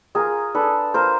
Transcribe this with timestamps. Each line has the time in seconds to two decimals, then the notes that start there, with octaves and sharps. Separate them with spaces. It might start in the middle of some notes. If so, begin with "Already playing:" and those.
0.15 F4 G#4 A#4
0.55 D4 A4 B4
0.94 F4 A#4 C5